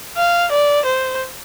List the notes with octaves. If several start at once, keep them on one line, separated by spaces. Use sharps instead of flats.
F5
D5
C5